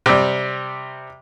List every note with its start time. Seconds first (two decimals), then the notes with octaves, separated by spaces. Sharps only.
0.06 C3 G3